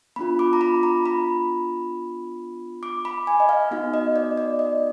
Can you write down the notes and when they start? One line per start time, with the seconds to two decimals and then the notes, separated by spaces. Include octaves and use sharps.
0.16 B3 D4 F4 B5
0.39 D6
0.53 A#5
0.61 B5
0.83 A#5
1.06 B5
2.83 D6
3.05 B5
3.27 G#5
3.40 D#5
3.49 F5
3.71 B3 D#4 F#4 F5
3.94 D#5
4.16 D5
4.37 D5
4.59 D#5